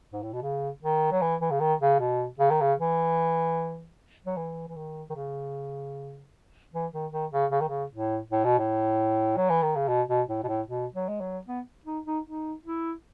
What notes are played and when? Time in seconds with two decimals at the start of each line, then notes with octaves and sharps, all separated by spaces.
0.13 G#2
0.23 A2
0.33 B2
0.42 C#3
0.82 D#3
1.12 F#3
1.22 E3
1.41 E3
1.51 C#3
1.60 D#3
1.81 C#3
2.00 B2
2.39 C#3
2.50 D#3
2.61 C#3
2.79 E3
4.26 F#3
4.37 E3
4.68 E3
4.76 D#3
5.10 D#3
5.15 C#3
6.73 E3
6.93 D#3
7.12 D#3
7.32 C#3
7.51 C#3
7.61 D#3
7.69 C#3
7.92 A2
8.31 A2
8.44 B2
8.59 A2
9.37 F#3
9.50 E3
9.62 D#3
9.76 C#3
9.88 B2
10.08 B2
10.28 A2
10.43 B2
10.48 A2
10.68 B2
10.94 F#3
11.09 G#3
11.21 F#3
11.47 B3
11.85 D#4
12.05 D#4
12.26 D#4
12.65 E4